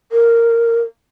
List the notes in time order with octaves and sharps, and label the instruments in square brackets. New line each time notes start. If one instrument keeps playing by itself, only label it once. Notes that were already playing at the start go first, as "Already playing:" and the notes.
[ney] A#4